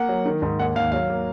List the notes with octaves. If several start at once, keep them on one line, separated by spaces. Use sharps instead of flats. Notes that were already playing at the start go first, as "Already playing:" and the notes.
Already playing: A#3 F#5
F#3
D#3
G#2
D#2 F#5
D#2 F5
F#3 F5
A#3